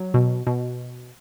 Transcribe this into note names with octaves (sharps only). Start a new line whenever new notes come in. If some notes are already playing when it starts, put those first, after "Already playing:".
Already playing: F#3
B2
B2